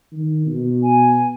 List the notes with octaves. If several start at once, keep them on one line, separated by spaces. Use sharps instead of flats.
D#3
B2
G#5